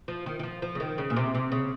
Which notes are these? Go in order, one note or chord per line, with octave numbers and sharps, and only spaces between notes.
F3
D#3
D#3
F3
F3
C#3
D#3
C#3
A#2
C3
C3
C#3